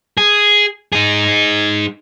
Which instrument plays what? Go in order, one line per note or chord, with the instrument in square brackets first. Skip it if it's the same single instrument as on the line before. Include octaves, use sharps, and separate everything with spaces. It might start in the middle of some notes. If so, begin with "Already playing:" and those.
[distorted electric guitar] G#4
D#4 G#4